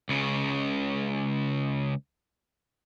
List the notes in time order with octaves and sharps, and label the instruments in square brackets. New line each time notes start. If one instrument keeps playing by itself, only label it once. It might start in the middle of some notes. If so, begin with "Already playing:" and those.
[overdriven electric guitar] C#2 C#3